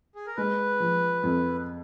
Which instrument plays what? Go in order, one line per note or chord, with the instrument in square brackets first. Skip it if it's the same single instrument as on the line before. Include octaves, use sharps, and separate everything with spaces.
[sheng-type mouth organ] G#4
A#4
[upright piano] G#3 [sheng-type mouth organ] B4
[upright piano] F3
F2